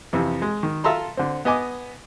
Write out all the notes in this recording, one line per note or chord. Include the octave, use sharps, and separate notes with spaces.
F2 C3 E3
G#3
D#3
F4 A4 E5 A5 A#5 C6
D3 C4
B3 D#5 G#5 D6